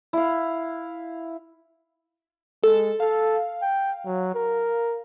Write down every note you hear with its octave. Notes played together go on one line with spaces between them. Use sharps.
E4 F5
G#3 A4
A4 F5
G5
F#3
A#4